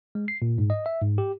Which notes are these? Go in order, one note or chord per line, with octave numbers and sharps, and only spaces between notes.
G#3
C7
A#2
G#2
D#5
E5
G#2
G4